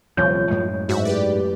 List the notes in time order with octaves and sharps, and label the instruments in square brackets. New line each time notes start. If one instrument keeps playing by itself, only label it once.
[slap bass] D#1 C2 F#2 [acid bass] F3 [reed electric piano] C#5 G6
[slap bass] F#2 A2 G#3
[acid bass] G#2 [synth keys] F#4 E5
[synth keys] G4 B4 D5